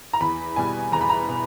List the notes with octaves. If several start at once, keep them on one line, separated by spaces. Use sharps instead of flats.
A#5
E2 B5
B2 G3 G#5
E2 A#5
B5
A#5
B2